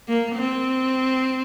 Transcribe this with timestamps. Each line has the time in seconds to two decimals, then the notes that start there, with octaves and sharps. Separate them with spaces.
0.08 A#3
0.35 C4